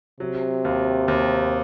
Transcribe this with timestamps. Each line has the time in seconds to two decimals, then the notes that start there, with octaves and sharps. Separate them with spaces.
0.20 C3 F#3
0.65 D#2
1.08 D#2